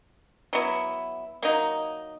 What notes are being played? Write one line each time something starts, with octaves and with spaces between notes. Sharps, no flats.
F#3 B3 E4
F#3 A#3 D#4